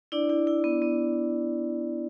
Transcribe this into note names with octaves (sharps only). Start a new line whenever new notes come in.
D4 E4 D5
E4
E4
B3
B3